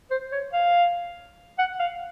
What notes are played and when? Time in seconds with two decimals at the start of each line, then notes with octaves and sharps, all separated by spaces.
0.11 C5
0.32 C#5
0.53 F5
1.59 F#5
1.80 F5